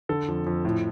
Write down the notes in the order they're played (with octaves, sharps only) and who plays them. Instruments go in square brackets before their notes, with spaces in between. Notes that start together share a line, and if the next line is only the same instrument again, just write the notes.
[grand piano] D3 A4
F2
F2
A2